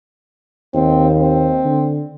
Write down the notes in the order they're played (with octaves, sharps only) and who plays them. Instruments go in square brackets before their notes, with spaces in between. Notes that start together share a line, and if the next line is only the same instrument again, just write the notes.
[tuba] D#2 [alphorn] C4
[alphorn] C4
[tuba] D3